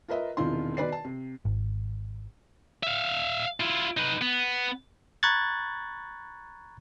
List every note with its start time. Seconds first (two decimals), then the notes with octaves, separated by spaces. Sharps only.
0.08 F4 A#4 B4 D#5 E5
0.37 E1 C3 D#3 E4 F4 C6
0.77 B2 D#3 B4 D5 C7
0.92 A5
1.05 C3
1.45 G#1
2.83 E5 F5
3.60 E4 F4
3.97 D#4 B4
4.22 B3
5.23 A#5 B5 C#6 F#6 G#6 A6